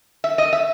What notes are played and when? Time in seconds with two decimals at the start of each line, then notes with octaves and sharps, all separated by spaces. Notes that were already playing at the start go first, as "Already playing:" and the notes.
0.24 E5
0.38 D#5
0.53 E5